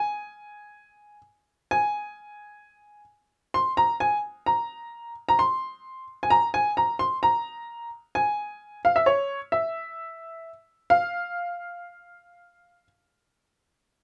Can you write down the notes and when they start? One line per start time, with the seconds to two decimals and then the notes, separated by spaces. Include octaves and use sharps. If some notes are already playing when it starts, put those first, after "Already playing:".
Already playing: G#5
1.71 G#5
3.54 C6
3.77 A#5
4.00 G#5
4.46 A#5
5.29 A#5
5.39 C6
6.23 G#5
6.30 A#5
6.54 G#5
6.77 A#5
6.99 C6
7.23 A#5
8.15 G#5
8.85 F5
8.96 E5
9.06 C#5
9.52 E5
10.90 F5